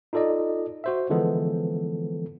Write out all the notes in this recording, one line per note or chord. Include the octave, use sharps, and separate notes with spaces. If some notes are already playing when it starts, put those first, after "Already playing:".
D#4 F4 A4 D5 D#5
F#4 C5 E5
D3 E3 F3 G#3 B3 A4